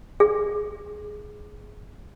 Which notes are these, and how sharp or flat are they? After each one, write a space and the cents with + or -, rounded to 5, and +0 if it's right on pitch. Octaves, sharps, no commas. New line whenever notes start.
G#4 +10